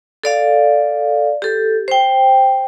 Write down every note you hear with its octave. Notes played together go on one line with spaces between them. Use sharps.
A4 D5 F5
G4 A4
C5 G5